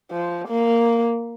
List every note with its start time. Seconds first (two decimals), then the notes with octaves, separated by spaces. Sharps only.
0.11 F3
0.48 A#3